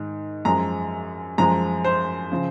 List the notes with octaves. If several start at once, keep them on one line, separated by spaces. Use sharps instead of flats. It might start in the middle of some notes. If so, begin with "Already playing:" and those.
Already playing: G#2 D#3
F#2 F3 G#3 A#5
F#2 F3 G#3 A#5
C5
C#3 F3